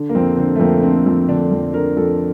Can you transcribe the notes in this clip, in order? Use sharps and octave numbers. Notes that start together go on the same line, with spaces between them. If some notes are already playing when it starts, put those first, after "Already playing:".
Already playing: D3
A#3
F2 C4
D3 C4
A3
F2 A#3
D3 C4
F2
D3 D4
F2
D3 A#4
F2 A4